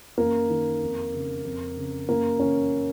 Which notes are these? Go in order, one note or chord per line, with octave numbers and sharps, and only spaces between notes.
F#2 A#3
D#3
F2
C#3
F2
C#3
F#2 A#3
C#3 C#4